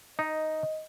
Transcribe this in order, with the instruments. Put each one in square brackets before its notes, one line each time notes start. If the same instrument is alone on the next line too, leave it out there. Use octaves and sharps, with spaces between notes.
[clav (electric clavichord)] D#4 [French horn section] D#5